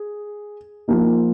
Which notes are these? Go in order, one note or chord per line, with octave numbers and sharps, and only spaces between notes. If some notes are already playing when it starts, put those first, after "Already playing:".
Already playing: G#4
F3 A#3 D#4